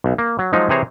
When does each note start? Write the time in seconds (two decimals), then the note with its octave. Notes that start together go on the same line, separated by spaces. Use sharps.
0.04 B1
0.18 A#3
0.39 F#3
0.53 F3 F#3 G#3 D#4
0.69 C3 E3 G#4 C5 C#5 A#5